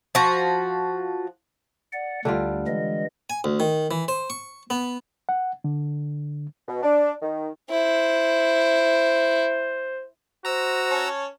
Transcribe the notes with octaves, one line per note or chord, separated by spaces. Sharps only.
F3 F#4
D5 F#5
D2 D3 G3 F4
E3 G#3 D#5
G#5
D2
D#3
E3
C5
C#6
B3
F#5
D3
B2
D4
D#3
E4 C5
F#4 C5 A#5 E6
C#4 C#5 A5